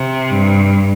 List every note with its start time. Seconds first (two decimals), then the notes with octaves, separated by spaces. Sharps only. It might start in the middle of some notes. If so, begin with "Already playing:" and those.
Already playing: C3
0.30 G2